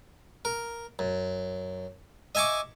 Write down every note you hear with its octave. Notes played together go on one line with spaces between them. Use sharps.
A#4
F#2
D#5 E5 G#5 C#6 D6